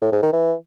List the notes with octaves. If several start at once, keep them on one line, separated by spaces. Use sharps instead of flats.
A2
G#2
D#3
E3